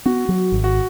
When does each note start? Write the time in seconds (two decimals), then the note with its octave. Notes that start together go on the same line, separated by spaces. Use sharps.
0.05 B3 F#4
0.29 F#3
0.52 G#1
0.64 F#4